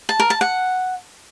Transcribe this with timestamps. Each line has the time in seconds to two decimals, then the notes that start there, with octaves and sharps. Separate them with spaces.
0.09 A5
0.20 A#4
0.30 A5
0.41 F#5